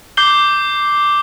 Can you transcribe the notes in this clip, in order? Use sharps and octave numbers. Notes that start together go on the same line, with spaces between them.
D6 G6 C7 G7